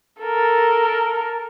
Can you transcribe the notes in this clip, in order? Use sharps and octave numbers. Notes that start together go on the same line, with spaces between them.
A4 A#4